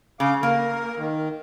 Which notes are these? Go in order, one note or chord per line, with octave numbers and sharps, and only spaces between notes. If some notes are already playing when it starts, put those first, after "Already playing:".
C#3 F5 D6
A#3 A#4
D#3